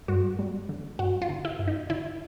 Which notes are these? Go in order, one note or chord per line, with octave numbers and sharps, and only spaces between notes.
G2 F#4
G3
D3
G2 F#4
F4
D3
E4
G2
D#4
D3 E4